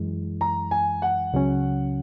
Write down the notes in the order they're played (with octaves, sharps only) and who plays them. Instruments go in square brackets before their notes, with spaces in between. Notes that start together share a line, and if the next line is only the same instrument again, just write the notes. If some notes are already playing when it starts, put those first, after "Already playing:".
Already playing: [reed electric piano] F#2 E3 G#3
[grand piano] A#5
G#5
F#5
[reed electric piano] C#2 C#3 F#3 C#4